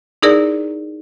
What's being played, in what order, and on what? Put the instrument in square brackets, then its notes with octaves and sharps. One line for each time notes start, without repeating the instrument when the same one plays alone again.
[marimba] D#4 E4 G#4 A#4 D5